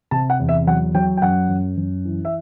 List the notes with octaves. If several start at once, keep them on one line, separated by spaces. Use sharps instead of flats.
C3 A5
F#5
E2
E5
F#3 F#5
F#3 G5
G5
F#2 F#5
F#2
F#2
E3
E5